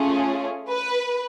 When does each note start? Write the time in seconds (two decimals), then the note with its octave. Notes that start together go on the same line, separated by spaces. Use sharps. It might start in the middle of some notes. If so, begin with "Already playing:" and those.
Already playing: A3 C#4 F4 G#4
0.69 B4